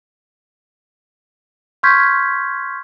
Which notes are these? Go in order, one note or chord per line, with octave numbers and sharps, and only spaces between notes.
C6 C#6 F6 G6 G#6 B6